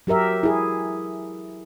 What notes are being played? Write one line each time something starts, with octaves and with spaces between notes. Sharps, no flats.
F#3 G4 A#4 E5
E4 G#4